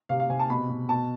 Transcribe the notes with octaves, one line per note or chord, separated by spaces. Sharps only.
C3 F5
F5
C3 G#5
A5
B2 B5
B2
B2 A5